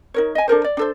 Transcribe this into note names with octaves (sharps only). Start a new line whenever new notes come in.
D#4 A#4 C#5
D#5 G#5
D4 A4 A#4 C5
D5
D4 A4 C5